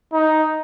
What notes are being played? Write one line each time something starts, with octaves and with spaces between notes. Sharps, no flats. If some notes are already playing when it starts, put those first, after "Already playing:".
D#4